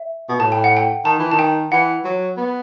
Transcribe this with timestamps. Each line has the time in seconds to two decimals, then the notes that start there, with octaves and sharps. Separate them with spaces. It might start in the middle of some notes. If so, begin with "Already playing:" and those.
Already playing: E5
0.29 B2
0.40 A2 A5
0.52 G5
0.64 F#5
0.77 G5
1.05 D#3 A5
1.19 E3
1.31 D#3 A5
1.39 G5
1.72 E3 F#5
2.05 F#3
2.37 B3